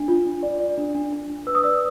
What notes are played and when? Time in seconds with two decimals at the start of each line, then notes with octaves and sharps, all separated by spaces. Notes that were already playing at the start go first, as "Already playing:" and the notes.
Already playing: D4
0.08 F4
0.26 D4
0.43 D5
0.60 D5
0.78 D4
0.95 D4
1.13 D4
1.30 D4
1.47 B4 E6
1.55 D#6
1.63 D5 E6